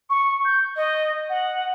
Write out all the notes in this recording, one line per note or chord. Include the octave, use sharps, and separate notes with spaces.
C#6
G6
D#5
F#5